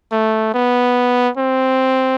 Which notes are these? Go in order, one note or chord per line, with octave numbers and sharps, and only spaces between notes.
A3
B3
C4